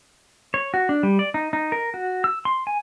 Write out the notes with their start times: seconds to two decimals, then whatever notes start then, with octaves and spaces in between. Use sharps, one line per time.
0.54 C#5
0.74 F#4
0.89 D4
1.03 G3
1.19 D5
1.34 D#4
1.53 D#4
1.72 A#4
1.94 F#4
2.24 E6
2.45 C6
2.67 G#5